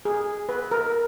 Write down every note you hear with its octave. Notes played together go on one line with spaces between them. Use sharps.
G#4
B4
A#4